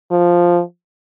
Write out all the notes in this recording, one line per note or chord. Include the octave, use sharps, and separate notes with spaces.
F3